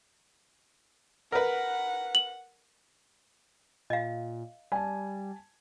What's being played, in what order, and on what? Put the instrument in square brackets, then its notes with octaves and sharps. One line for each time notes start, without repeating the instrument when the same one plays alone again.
[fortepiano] A#4 B4 [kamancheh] F#5
[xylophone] F#7
[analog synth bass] A#2 [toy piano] D#5 F5
[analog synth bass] G3 [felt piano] G#5 A5